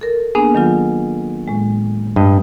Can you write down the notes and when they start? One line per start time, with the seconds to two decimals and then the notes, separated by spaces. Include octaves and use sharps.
0.01 A4 A#4
0.35 A#3 B3 D4 G#4
0.55 D#3 F#3 F4
1.48 A2 G#3
2.16 G2 D#5